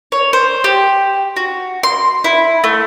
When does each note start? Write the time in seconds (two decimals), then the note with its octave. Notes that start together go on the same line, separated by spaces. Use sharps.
0.12 C#5
0.33 C5
0.64 G4
1.36 F#4
1.83 C6
2.24 E4
2.64 A3